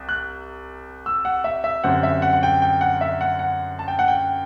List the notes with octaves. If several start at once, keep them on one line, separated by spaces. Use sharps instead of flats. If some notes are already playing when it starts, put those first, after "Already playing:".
Already playing: C2 C3
F#6
E6
F#5
E5
E5
F#2 D3 G3 C4 F#5
E5
F#5
F#5
G5
G5
F#5
E5
F#5
F#5
A5
G5
F#5
G5